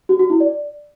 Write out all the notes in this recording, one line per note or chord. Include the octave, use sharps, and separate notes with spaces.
F#4
F#4
E4
D5